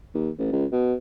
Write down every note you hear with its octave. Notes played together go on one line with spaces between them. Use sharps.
D#2
A1
C#2
B2